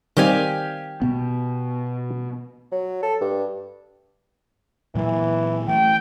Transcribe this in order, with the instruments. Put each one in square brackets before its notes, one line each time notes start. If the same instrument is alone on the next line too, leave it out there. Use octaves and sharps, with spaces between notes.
[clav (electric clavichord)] D#3 G3 C4 [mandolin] G4 F5 G#5
[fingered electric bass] B2 B3
[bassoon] F#3
A4
G2
[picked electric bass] A#2 F#3 A#3 [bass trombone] E3
[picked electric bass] E3 A3 [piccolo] G5